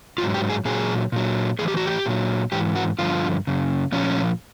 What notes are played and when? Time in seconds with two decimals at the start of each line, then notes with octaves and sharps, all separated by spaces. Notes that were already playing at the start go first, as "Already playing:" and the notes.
0.18 G#2 D#3 F#3 F4
0.34 G4
0.50 G#4
0.65 A#2 F#3 G#4
1.12 A#2 F#3
1.59 A2 E3 G#4
1.68 G4
1.77 F#4
1.86 G4
2.06 A#2 F#3
2.52 G#2 E3 G4
2.76 F#4
2.99 G2 D3 F3 F4
3.47 F#2 C#3
3.92 A#2 F3 C#4